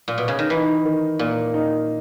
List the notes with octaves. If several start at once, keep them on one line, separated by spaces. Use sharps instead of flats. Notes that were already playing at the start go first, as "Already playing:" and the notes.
A#2
B2
C#3
D#3
E3 D#4
D#3
A#2 A#3
D#4